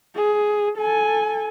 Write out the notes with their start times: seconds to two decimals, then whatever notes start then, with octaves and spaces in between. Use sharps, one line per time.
0.16 G#4
0.78 A4 G#5